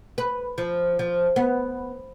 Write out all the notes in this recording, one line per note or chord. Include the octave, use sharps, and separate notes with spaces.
B4
F3
F3
B3